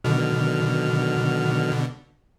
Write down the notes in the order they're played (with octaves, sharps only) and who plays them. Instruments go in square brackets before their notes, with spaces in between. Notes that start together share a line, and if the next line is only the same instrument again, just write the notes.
[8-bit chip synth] B2 D3 [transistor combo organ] D#3 F#3 F6